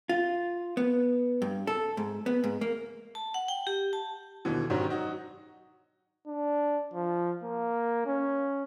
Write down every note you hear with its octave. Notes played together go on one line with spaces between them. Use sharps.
F4
B3
G2
A4
G#2
B3
G#2
A#3
A5
F#5
G5
G4
A5
D#2 B2 D3 E3
G#2 D#3 F#3 C#4 D4 G4
F#3 D#4 F#4
D4
F3
A#3
C#4